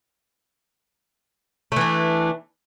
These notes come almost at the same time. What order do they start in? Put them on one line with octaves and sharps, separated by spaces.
A3 E3 D4